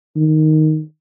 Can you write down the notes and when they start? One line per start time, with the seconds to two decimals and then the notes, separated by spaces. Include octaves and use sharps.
0.16 D#3